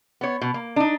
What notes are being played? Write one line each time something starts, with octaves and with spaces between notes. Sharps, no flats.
B3 C#5
B2
A#3
D4 D#4